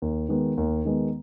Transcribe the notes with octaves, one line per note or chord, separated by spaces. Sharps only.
D#2
D#3 G#3 B3
D#2
D#3 G#3 B3